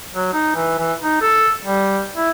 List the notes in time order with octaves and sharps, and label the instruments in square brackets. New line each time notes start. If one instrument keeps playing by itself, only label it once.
[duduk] F#3
D#4
E3
E3
D#4
A4
G3
E4